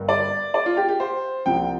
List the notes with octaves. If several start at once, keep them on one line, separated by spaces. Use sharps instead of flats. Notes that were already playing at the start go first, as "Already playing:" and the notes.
Already playing: G1 G2 G3 A#3
D5
D5
F4
G4
G4
C5
C2 C3 F3 G5